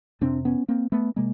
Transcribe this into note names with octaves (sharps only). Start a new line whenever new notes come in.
F2 C3 C4 D4
B3 C#4
A#3 C4
A3 B3
C3 G#3 A#3